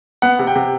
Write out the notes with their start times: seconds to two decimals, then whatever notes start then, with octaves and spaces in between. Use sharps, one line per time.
0.22 B3 F#5
0.39 C3
0.47 G5
0.56 C3